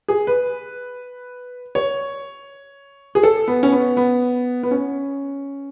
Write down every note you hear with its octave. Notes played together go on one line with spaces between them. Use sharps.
G#4
B4
C#5
G#4
A4
B3
C#4
B3
B3
B3
C#4